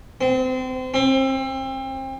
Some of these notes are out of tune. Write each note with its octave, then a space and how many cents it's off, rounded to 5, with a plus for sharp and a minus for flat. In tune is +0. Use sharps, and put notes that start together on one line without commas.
C4 -30
C4 +30